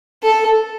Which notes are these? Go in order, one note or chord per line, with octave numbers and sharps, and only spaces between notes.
A4